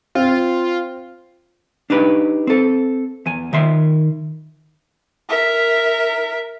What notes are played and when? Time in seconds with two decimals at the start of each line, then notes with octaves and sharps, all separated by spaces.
0.15 C4 F4
1.90 D4 D#4 G4 B4
2.47 C4 A4
3.26 E2 G#5
3.53 D#3 E5 C6
5.29 A#4 E5